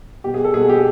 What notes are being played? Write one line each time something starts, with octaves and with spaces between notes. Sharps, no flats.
B2 G4
G#4
A4
B2 G#4
G4